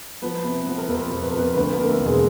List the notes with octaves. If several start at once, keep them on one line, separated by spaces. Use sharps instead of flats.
F3 B3 B4
C3 B3 B4
F3 B3 B4
A#4
F2 B3 B4
F2
B4
A#4
F2 B3 B4
D2 B3 B4
D3 A#3 A#4
A3 A4
E1
G#3 G#4